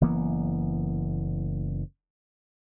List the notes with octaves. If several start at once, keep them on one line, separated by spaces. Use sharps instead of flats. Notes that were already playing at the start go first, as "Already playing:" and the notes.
F#1 E3 A#3 B3